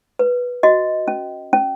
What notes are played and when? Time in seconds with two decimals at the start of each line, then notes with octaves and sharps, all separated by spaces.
0.19 B4
0.63 F#4 D#5
1.08 C#4
1.53 C#4